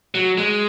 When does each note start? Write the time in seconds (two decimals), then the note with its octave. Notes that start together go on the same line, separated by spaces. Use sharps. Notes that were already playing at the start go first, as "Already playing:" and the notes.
0.15 F#3
0.38 G#3